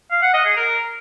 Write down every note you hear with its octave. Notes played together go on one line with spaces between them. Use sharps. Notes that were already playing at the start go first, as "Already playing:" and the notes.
F5
F#5
D#5
G#4
A#4